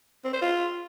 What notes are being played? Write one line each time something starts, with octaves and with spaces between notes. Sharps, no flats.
C4
C5
F4